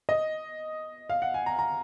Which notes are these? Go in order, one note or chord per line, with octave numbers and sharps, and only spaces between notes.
D#5
F5
F#5
G#5
A#5
A#5